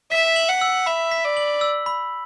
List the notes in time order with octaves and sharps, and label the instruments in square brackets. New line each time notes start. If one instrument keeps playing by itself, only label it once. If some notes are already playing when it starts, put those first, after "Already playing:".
[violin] E5 [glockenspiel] B6
[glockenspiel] F#7
[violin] F#5
[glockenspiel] E6
[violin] E5 [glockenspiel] B5
[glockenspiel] B6
[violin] D5
[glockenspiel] F#7
E6
B5